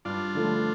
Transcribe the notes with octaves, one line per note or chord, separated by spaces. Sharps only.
G2 D4 F4
D3 F3 A3